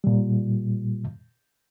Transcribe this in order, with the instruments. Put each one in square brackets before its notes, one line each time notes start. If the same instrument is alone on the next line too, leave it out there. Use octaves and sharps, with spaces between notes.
[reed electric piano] A#2 G3